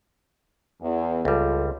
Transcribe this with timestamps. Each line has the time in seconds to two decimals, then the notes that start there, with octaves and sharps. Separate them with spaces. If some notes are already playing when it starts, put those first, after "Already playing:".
0.82 E2
1.25 C#2 G3 F4 A4